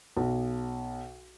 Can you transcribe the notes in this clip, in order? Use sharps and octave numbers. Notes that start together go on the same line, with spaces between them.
B1